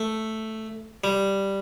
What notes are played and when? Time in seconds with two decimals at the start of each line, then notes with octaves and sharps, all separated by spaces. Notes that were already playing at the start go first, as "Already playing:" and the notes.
Already playing: A3
1.04 G3